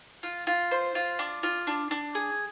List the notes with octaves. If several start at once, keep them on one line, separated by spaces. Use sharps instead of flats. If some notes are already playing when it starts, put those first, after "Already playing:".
F4
F4
C5
F4
D4
F4
D4
D4
G#4